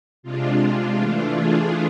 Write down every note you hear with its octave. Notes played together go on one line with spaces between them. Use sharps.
C3 G#3 D4 F4
E3 A3 D4
G#4